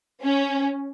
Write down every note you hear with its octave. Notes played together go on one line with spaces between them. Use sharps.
C#4